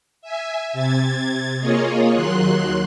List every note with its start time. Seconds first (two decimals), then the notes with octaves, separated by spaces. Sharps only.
0.22 E5 G#5
0.73 C3 G#6 A6
1.60 A#3 F4 G#4 C#5 D#5
2.12 D#2 D#3 F#3 C6 F#6